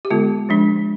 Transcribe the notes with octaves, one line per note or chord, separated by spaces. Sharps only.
G4
D3 G#3 B3 F4
F3 G#3 D4